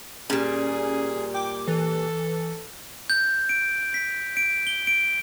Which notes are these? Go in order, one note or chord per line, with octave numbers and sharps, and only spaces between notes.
A#2 G3 C#4 G#4
G5 D6
E3 A4
G6
D7
B6
D7
G7
D7